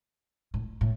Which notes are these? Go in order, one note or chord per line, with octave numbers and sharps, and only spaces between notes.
A2
A2